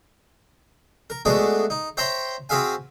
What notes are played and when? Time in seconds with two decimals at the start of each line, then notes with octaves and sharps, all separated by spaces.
1.10 A#4
1.25 G#3 A3 B3 D4 F#4 G#4
1.70 D#4
1.97 C5 C#5 E5 G5 A#5 C6
2.49 C4 F#4 G#4 E5 F5 G#5